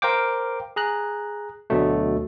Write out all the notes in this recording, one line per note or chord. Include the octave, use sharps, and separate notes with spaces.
A#4 C5 F5 G5 D6
G#4 A#5 F#6
D2 B2 D3 F#3 A3